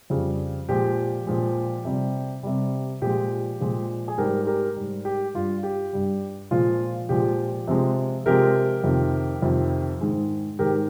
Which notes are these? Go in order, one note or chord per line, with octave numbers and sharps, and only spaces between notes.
F2 C#3 G3
A#2 F3 G#3 G4
A#2 F3 G#3
C3 G3
C3 G3
A#2 F3 G#3 G4
A#2 F3 G#3
G#4
G#2 G3 G4 A#4
G4 A#4
G#2 G3
G4
G2 G3 F4
G4
G2 G3
A#2 F3 G#3 F4
A#2 F3 G#3 G4
C3 F3 G#3
C3 F3 G#3 G4 A#4
F2 C3 D#3
F2 C3 D#3
G#2 D#3 G#3
G#2 D#3 G#3 G4 A#4